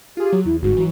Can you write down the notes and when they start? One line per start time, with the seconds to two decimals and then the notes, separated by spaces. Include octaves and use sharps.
0.17 F4 G4 G#4
0.32 F#3
0.46 E2 E4
0.62 G1 G#2 F#4
0.77 E3 F#3